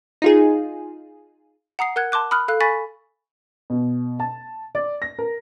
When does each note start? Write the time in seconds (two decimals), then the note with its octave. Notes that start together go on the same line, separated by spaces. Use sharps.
0.22 D#4 F4 G#4
1.79 F#5 A#5 D#6 C7
1.96 A#4 F#5 F#6 G#6
2.12 A5 C6 D6 F#6
2.31 B5 D#6 F6 F#6
2.48 A4 F5 F#6
2.60 G#5 B5 C#6 A6 B6
3.70 B2
4.20 A5
4.75 D5
5.02 A#6
5.19 A#4